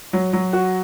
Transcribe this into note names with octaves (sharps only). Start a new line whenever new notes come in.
F#3
F#3
F#4